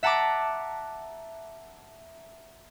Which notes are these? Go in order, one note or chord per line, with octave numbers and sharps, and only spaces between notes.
E5 F#5 A5 A#5 D6